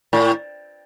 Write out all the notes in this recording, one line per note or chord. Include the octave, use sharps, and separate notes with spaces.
A2